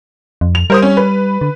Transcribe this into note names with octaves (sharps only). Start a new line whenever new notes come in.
F2
F7
G3 A#4 C5 D#6
C#4
B4
D3